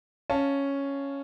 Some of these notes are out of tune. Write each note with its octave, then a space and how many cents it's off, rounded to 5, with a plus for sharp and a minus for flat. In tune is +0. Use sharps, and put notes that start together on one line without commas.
C#4 +0 F5 +0 A5 +0